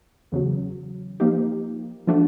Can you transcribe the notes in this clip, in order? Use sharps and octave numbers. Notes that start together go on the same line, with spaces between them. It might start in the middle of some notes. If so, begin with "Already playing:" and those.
E2 C#3 F#3
F3 A#3 D#4 G4
F3 A3 D4 F#4